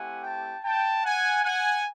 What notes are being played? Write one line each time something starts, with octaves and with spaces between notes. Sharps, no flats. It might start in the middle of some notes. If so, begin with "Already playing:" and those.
Already playing: A3 C4 E4 G4 F#5 G#5
G5 A5
G5 A5
F#5 G#5
F#5 G#5